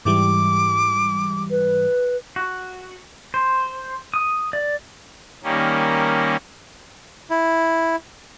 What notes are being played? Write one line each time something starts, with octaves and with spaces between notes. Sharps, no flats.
G#2 E3 G3 D6
B4
F#4
C5
D#6
D5
D#3 G3 A#3 C#4
E4